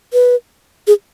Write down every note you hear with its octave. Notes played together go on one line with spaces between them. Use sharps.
B4
G#4